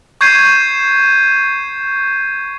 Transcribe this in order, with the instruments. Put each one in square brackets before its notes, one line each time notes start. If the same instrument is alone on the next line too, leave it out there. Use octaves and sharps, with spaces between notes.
[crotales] C#6 G6 G#6 C7 D#7